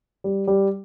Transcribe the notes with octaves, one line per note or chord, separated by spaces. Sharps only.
G3
G3